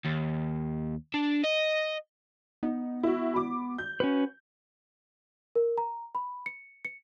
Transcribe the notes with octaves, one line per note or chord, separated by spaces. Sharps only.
D#2
D4
D#5
B3 D#4
E4 F#4
B5 D6
G6
C#4 F#4 B4
A#4
A#5
B5
C#7
C#7